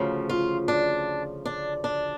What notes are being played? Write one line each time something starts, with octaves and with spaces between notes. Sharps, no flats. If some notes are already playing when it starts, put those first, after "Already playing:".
Already playing: D2 C#3 F3
F4
D4
D4
D4